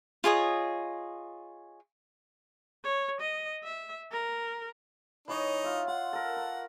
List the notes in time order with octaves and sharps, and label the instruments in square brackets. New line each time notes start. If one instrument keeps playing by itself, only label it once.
[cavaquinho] F4 G#4 C#5 D#5
[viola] C#5
D#5
E5
A#4
[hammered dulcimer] E3 C#5 D#5 [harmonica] D#4
[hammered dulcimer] F4 E5
[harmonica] F#5 [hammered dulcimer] C6
[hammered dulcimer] A4 A#4
A#5